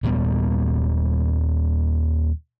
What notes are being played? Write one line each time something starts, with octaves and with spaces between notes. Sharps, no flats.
D#2 A#2 G3 B3